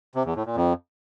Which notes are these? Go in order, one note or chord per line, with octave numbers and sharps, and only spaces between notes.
C3
E2
A2
A#2
F2